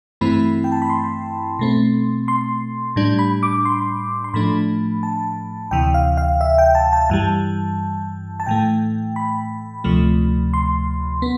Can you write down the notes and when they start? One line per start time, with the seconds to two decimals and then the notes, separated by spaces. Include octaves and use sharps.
0.21 G2 E3 A3 C4 E4 B5
0.64 G5
0.72 A5
0.82 B5
0.90 C6
1.59 B2 A3 C4
2.28 C6
2.96 A2 G3 D4
3.19 B5
3.43 D6
3.65 C6
4.24 C6
4.34 A2 F3 A3 D4 B5
5.03 A5
5.71 D2 C3 E3 G5
5.94 F5
6.17 F5
6.41 E5
6.58 G5
6.75 A5
6.93 A5
7.10 G2 E3 G3 A5
8.40 A5
8.46 A2 E3 A3 G5
9.16 B5
9.84 D2 C3 F3 A3
10.54 C6
11.22 B3